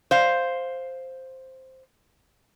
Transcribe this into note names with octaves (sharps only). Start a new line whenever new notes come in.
C5 F5